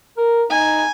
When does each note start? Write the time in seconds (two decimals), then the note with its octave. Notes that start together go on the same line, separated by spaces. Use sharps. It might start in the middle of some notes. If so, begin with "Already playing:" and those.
0.17 A#4
0.51 D#4 G#5